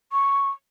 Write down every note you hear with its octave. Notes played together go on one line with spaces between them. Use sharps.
C#6